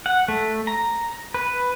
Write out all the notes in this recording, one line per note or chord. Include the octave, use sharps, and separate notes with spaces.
F#5
A3
A#5
B4